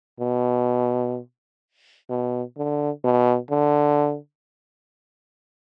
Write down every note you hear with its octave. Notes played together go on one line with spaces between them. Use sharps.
B2
B2
D3
B2
D3